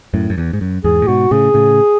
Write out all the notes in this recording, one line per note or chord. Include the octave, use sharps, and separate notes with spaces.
F#2 A2
F#2
E2
G#2
F#2
E2 G#2 G#4
A2
G#2 B2 F#4
A2 C#3 G#4
A2 C#3